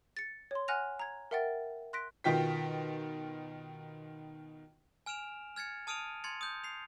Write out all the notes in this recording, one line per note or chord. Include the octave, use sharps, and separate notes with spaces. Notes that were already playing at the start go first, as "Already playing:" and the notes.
A6 C#7
C#5 C6
F#5 G#5 F6 F#6 A#6 F7
A#5 G#6
A#4 E5 F#5 G5 A6
C6 F#6 A#6 B6 D7
B2 D#3 F4 G5 B6
G#5 F6 D7 E7 F7
F6 G#6 A6 C#7
A5 D#6 F6 D7 D#7 F7
C6 G#6 A6 C#7 F7
D#6 G6
C7 F7